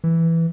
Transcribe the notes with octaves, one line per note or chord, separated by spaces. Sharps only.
E3